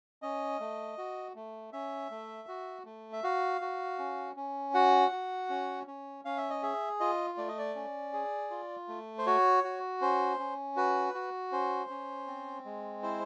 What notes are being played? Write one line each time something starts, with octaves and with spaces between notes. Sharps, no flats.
C#4 D#5
A3
F#4
A3
C#4 E5
A3
F#4
A3
E5
F#4 F5
F#4
C#4
C#4
F#4 F#5
F#4
C#4
C#4
C#4 F5
E5
D#5
G#4 E5
F4 D#5
A3 D5
D#5
D5
C#4
G#4
F4
A3
C5
F#4 C#5
F#4
C#4 C5
C#4
F#4 B4
F#4
C#4 C5
C#4
C4
G#3
E4 C5